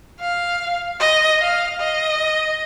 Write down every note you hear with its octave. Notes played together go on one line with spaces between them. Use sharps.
F5
D#5
F5
D#5